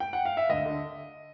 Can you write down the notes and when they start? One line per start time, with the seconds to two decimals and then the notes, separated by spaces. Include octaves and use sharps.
0.00 G5
0.13 F#5
0.25 F5
0.37 E5
0.49 D2 D#5
0.66 D3